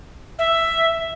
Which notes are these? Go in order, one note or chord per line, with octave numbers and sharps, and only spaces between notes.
E5